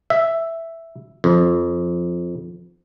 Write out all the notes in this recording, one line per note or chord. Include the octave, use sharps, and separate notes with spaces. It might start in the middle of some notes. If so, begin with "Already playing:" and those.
E5
F2